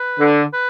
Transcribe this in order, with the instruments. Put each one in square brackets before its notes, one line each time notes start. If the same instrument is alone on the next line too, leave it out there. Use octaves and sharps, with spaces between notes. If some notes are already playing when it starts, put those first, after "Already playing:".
Already playing: [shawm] B4
[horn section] D3
[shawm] B4